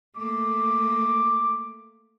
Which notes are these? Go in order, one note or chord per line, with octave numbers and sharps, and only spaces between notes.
A3 A#3 D6